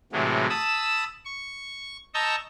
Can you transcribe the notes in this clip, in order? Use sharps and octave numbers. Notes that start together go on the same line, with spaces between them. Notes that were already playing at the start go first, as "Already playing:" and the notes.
A2 C3 E3 F#3 G#3
A5 B5 D#6 E6
C#6
D#5 A5 A#5 C#6 E6 G6